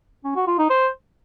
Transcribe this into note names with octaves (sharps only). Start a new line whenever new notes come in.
C#4
F#4
F4
D#4
C5